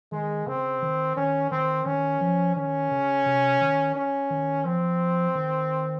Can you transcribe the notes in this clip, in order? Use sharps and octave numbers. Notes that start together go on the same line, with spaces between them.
D#3 G#3
C#3 C4
D#3
D#3 C#4
D#3 C4
D#3 C#4
F3
D#3 C#4
C#3
C3
D#3
C#4
D#3
F3 C4
D#3